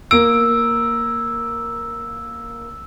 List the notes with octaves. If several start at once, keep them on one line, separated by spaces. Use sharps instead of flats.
A#3 E6 D7